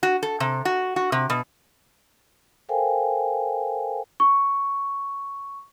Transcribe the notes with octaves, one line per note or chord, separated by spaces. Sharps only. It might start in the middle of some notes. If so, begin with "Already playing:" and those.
F#4
A4
C3
F#4
F#4
C3
B2
A4 A#4 C5 F5 G5 G#5
C#6